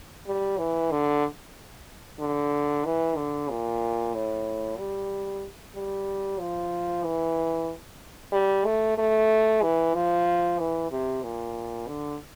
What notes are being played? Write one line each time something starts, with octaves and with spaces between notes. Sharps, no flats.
G3
E3
D3
D3
E3
D3
A#2
A2
G3
G3
F3
E3
G3
A3
A3
E3
F3
E3
C3
A#2
D3